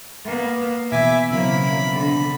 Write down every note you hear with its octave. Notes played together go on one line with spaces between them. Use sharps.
A#3 B3
B2 E3 E4 E5 G#5 D6
C#3 F#3 A#3 C4 E4 B5
D3